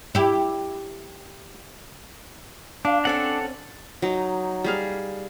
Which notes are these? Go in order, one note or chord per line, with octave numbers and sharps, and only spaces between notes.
E4 G4
D4 F4
C4 C#4 A4 F#5 G#5
F#3 D#4
G3 G#4 F5